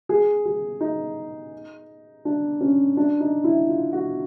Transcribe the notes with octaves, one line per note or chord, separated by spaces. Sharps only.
G#4
G#4
D#4
D4
C#4
D4
D#4
E4
F4
F#4